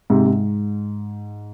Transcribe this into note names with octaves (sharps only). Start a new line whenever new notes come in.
G#2 C3
G#2